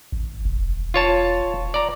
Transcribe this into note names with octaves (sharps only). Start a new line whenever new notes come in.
G#1
E1
F4 C#5 A5
D5 A#5